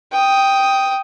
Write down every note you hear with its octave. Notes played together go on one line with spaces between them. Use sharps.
G5 D#6